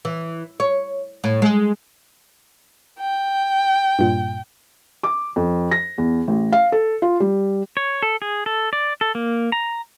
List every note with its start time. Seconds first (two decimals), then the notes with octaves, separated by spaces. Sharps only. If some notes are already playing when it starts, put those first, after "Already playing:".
0.05 E3
0.60 C#5
1.24 A2
1.42 G#3
3.00 G5
3.99 G2 A#2
5.03 D6
5.36 F2
5.71 A#6
5.98 E2
6.27 A1
6.52 F5
6.72 A4
7.02 F4
7.20 G3
7.77 C#5
8.03 A4
8.22 G#4
8.46 A4
8.73 D5
9.01 A4
9.15 A#3
9.52 A#5